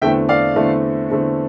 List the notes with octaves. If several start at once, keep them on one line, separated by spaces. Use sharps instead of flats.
E2 D3 A3 C4 E5 G5
D5 F5
E2 D3 A3 C4
E2 D3 A3 C4